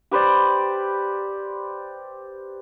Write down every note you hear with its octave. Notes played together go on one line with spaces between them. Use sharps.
G4 B4 C5 D5